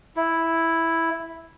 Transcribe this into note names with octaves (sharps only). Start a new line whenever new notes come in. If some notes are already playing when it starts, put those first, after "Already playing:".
E4